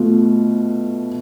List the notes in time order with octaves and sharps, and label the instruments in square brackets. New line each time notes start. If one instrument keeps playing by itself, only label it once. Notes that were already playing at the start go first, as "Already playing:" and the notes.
Already playing: [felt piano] B2 A3 F4